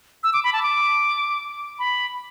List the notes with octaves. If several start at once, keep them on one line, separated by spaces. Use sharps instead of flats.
E6
D6
B5
A5
D6
B5